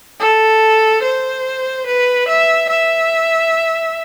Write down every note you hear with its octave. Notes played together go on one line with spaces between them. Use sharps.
A4
C5
B4
E5
E5